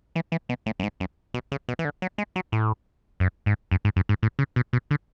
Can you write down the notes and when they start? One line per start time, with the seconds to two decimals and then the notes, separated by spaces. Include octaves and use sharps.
0.16 E3
0.32 E3
0.49 B2
0.66 A2
0.80 F#2
0.83 G#2
1.00 F#2
1.34 B2
1.52 C#3
1.69 B2
1.79 E3
1.85 D3
2.02 F#3
2.18 G#3
2.36 F#3
2.52 A2
3.20 F#2
3.46 G#2
3.71 F#2
3.85 G#2
3.96 F#2
4.09 G#2
4.23 A2
4.39 C#3
4.56 B2
4.73 B2
4.91 D3